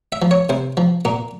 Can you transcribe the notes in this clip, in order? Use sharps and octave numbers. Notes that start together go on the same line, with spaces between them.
E5
F3
C#5
C3 C5
F3
A#2 A#4